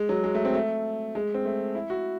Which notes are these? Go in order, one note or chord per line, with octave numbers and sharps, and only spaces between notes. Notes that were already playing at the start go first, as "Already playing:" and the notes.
Already playing: G#3
F#3
G#3
A3
C4
A3
G#3
C4
A3
E4
F#4